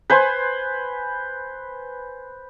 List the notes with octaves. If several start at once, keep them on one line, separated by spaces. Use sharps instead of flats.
B4 C5 G#5